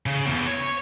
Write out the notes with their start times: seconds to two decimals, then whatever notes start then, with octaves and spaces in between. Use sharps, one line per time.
0.06 C#3
0.27 E2
0.47 C#5